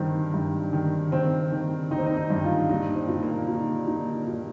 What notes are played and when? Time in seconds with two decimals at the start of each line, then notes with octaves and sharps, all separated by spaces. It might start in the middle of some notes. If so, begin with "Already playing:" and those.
Already playing: G2 D#3 C4
0.34 G2
0.73 D#3
1.12 D#3 C4
1.52 D#3
1.91 D#3 D#4
1.98 C4
2.06 D#4
2.17 D#4
2.30 G2
2.36 D#4
2.44 F4
2.69 A#2 D#4
2.96 C4
3.08 A#2
3.23 A#3
3.48 A#2 D#4
3.87 A#2 D#4
4.27 A#2